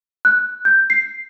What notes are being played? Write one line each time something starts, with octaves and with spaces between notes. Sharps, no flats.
F#6
G6
C7